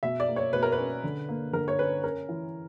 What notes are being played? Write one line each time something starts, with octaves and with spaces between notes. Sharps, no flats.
B2 E5
D5
A#3
C#5
B2 B4
A#4
B4
C#4
D3
A#3
D3 A#4
C#5
C#4 B4
C#4 A#4
E3